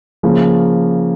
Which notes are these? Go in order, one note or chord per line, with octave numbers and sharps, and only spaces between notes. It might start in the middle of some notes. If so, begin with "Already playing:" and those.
C#3 F3 A#3